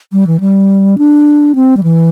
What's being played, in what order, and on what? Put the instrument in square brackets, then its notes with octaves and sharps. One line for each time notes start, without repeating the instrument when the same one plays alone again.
[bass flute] G3
E3
G3
D4
C4
G3
E3